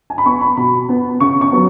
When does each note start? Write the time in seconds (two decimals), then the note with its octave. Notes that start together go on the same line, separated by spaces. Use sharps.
0.10 G#5
0.18 B5
0.26 B3 C#6
0.41 B5
0.57 B2 B5
0.89 B3
1.20 C#3 C#6
1.41 C#6
1.52 F#3 B3